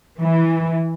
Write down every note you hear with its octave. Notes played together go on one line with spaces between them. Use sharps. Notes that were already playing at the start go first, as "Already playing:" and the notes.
E3